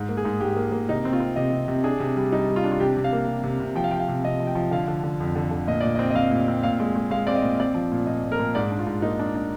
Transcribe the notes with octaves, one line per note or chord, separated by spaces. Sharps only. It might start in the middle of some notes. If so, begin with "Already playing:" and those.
Already playing: G#2
A#3
G#4
G#2
G#2 G4
A#3
A#3
C3 D#4
C4
F4
C4
C3 D#5
C3
C3
D4 G#4
C3
G3
G3 D#4
G3
F4
D4
F4
C3 G4
C3
F5
A#3
C3
C3
C3
F3 G5
F5
F3 G5
F5
C3
C3 D#5
F3
G5
F3
D3 F5
D3
D3
F2
D3
D3
A#2 D#5
A#2 D5
D#5
C4
D#5
C4 F5
A#2
C4
A#2 F5
G#3
G#3
G#3 F5
C4 D5
D#5
A#2
C4 D5
F3
A#2
A#2 D#5
A#2
A#4
A#2
G#2 D5
D4
F4
G#2
A#3 D#4
D4
D4